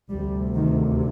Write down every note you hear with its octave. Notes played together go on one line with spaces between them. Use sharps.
D2 C3 G3
D#3